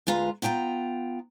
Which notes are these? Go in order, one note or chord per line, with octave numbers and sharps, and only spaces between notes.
D2 G#3 F4 B4 A#5
B3 F4 G5 A5 A#5